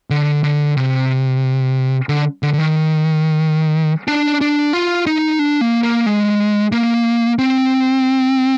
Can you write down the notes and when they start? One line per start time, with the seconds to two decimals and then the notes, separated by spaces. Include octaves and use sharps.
0.10 D3
0.43 D3
0.77 C3
2.09 D3
2.43 D3
2.54 D3
2.58 D#3
4.08 D4
4.41 D4
4.73 F4
5.07 D#4
5.39 D4
5.61 A#3
5.83 A#3
6.06 G#3
6.72 A#3
7.39 C4